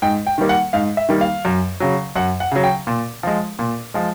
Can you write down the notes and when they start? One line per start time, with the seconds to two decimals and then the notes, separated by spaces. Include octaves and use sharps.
0.02 G#2 G5
0.27 G5
0.38 D#3 G3 A#3
0.49 F#5
0.73 G#2 F5
0.97 E5
1.09 D#3 G3 A#3
1.21 F5
1.45 F#2
1.80 C#3 F#3
2.16 F#2 F#5
2.40 F#5
2.51 C#3 F#3
2.64 G5
2.87 A#2
3.23 F3 G#3
3.59 A#2
3.94 F3 G#3